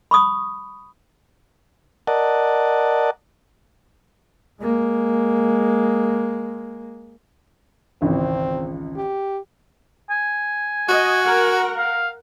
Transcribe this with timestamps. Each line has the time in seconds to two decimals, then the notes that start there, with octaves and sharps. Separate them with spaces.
0.11 B5 C#6 D#6
2.07 A#4 D5 D#5 F#5 A5
4.61 G#3 A#3
8.02 G#1 C#2 E3 C4
8.96 G4
10.10 G#5
10.89 F#4 D#5
11.25 A#4 F#5
11.78 F5